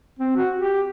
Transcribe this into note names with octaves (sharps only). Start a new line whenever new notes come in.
C4
F#4
G4